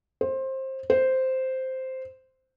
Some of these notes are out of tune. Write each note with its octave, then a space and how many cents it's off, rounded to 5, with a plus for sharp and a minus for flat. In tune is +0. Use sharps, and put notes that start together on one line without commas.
C5 +20
C5 -5